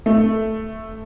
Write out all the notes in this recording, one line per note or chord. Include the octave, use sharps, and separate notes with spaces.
A3